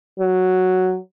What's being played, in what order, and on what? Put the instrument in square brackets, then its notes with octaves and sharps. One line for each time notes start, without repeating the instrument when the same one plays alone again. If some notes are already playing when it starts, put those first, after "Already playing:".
[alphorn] F#3